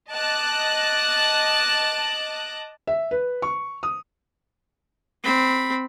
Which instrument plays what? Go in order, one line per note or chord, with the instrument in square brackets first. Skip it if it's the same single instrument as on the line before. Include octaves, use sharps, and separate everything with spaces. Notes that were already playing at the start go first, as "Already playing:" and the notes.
[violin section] D#5 A5 D6 F#6 A#6
[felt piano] E5
B4
C#6
D#6
[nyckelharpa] C4 B5